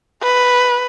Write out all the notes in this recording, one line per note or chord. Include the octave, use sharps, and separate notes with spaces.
B4